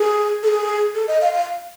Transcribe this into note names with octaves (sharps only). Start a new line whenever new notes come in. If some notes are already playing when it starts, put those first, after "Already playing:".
Already playing: G#4
A4
G#4
A4
D#5
F5
F5